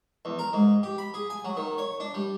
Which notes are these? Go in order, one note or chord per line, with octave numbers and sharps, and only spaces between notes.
E2
A#4
G#2
G4
B5
G#4
G#5
F#3
D#3
C#5
D4
G3